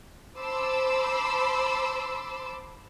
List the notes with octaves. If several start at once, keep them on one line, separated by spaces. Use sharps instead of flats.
C5 A5 B5 C6 D6 E6